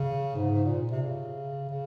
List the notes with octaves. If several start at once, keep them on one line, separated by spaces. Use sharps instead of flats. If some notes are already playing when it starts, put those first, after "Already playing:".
Already playing: C#3
G#2
G#2
A#2
C3
C#3
C#3